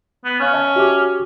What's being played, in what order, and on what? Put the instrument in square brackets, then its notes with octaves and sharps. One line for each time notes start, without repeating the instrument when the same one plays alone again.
[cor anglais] B3
[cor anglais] C#4 [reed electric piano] F5 F6
[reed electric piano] D#5 E5 A5
F#4 G4 D6